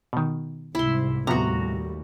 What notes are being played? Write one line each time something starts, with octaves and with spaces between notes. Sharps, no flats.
B2 D#3
C2 G#2 E4 C6
D#2 A2 C3 F3 G3 B3 F#4 A#5